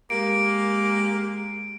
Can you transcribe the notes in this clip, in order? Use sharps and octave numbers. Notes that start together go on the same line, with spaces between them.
G#3 A#3 G4 D7